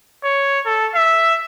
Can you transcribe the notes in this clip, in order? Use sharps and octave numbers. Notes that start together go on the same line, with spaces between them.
C#5
A4
E5